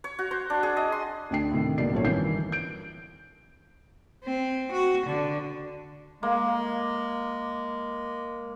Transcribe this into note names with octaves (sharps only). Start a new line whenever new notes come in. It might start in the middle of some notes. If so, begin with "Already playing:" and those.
C#5
F#4
C5
D4
G#4
D#5
C6
D2 D3 D4 G5 C7
A2 C3 D#3
C#2 B2 A#3 D#4 D5 C7
A#1 F#2 F3 A3 C#5
G1 D#3 E3 G6 C7
G6 D7
C4
F#4
D3
G#3 A#3